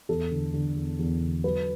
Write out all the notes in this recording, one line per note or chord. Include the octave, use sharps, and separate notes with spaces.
E2 A4
D3
D3
E2
E2
D3
F#3 B4